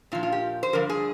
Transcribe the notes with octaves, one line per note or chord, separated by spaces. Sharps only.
A#2 F3 F4
F4
G4
C5
G2 D3 F3 A#4
G#4